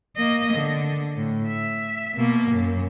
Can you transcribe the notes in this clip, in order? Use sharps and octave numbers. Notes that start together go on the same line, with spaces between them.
A#3 D#5
D3
A2
E5
B2 A#3
F#2